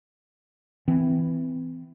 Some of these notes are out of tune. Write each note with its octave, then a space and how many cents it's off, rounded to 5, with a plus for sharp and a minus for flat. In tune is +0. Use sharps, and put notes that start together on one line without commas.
E3 +0 C4 -35